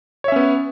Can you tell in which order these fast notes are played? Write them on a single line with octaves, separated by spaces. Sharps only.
C#5 E5 C#4 B3